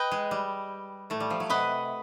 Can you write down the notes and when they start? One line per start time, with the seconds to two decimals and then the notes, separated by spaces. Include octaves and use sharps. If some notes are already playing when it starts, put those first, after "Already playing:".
Already playing: B4 D#5 G5
0.11 G#3
0.31 G3
1.10 A2 A3
1.20 G3
1.30 F3
1.40 F#3
1.49 C3 B4 D#5 F#5 B5